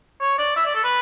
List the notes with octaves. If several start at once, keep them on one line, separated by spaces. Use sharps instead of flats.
C#5
D5
E5
D5
A4
B4